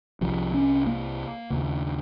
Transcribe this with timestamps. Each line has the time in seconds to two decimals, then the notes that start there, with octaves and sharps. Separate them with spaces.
0.21 C2 C3 F3
0.54 C#4
0.87 A#3
1.50 D#2 C#3